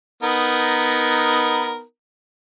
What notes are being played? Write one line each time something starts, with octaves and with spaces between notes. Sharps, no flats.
B3 D#4 A#4